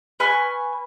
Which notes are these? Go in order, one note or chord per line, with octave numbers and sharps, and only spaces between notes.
B4 G#5 C#6 F6